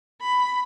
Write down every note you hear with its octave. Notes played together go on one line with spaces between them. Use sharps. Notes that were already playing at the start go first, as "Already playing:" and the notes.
B5